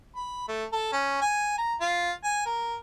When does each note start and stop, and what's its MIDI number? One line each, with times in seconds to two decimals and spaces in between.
0.16 0.48 83
0.48 0.64 57
0.73 0.90 69
0.93 1.17 61
1.21 1.58 80
1.58 1.74 82
1.80 2.12 65
2.24 2.42 80
2.46 2.76 70